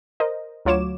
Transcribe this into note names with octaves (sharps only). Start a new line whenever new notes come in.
A#4 C5 D#5
D2 F#3 F4 C#5 D6 E7